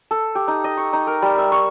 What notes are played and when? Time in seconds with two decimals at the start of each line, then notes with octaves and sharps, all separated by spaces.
0.11 A4
0.35 G4
0.48 D#4
0.64 D#5
0.77 C#6
0.93 D#4
1.07 A#4
1.22 G3
1.38 E5
1.52 C#6